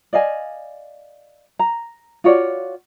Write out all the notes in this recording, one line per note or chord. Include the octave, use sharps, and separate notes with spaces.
D5 D#5 F5 G#5
A#5
F4 F#4 C#5 D5